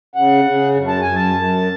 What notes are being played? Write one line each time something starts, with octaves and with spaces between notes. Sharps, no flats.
C#3 F#5
C#3
F#2
A5
F#2 G#5
A5
F#2